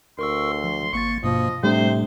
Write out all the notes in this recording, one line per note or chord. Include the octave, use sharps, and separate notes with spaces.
D2 A#4 C6 C#6 E6
F3
G#1 A#3 C#6 A6
G2 B2 F3 A#3 D#5
A2 C3 G3 A3 D4 C5